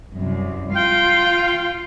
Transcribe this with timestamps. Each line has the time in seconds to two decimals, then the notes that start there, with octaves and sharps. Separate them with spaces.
0.15 C2 F#2
0.74 F4 F5 G5